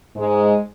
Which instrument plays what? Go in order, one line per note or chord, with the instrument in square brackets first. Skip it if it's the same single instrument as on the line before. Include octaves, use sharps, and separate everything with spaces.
[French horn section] G#2 G#3